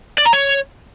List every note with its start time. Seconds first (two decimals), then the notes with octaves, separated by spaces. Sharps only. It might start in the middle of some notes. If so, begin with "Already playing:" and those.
0.18 D5
0.25 A#5
0.33 C#5